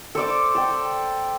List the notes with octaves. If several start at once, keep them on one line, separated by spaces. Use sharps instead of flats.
A4 C5 D5 D6
A4 G5